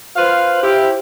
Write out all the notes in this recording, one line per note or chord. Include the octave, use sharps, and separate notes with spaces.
F4 B4 C5 F5
E4 G4